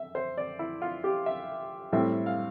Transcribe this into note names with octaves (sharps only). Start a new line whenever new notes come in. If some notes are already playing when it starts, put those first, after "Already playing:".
Already playing: E5
C5
D5
E4
F4
G4
E5
A2 G3 C4 E5
F5